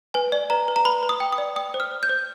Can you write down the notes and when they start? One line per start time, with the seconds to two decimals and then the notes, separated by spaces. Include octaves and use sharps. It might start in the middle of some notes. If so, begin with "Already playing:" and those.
0.14 B4 G#5
0.32 D5
0.50 B4 A#5
0.68 B4
0.76 A#5
0.85 B4 B5
1.03 B4
1.09 D#6
1.20 G5
1.32 D#6
1.38 D5
1.56 G5 D#6
1.74 C5
1.80 F6
1.91 C5
2.03 G6
2.09 C5